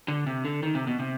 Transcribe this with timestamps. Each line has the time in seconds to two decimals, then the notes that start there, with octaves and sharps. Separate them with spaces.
0.08 D3
0.27 C3
0.45 D3
0.63 D#3
0.75 C3
0.87 B2
0.99 C3